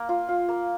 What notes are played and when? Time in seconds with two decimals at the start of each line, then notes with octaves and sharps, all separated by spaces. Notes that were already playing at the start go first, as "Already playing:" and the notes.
Already playing: A#3
0.09 F4
0.29 F4
0.49 A#3